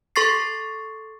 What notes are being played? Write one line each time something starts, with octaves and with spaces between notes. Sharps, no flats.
A4 C6 C#6 A6 C7